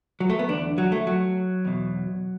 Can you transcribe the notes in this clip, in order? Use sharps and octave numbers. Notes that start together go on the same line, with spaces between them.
F#3
A3
B3
E2 D3 D4
F#3
A3
F#3
E2 B2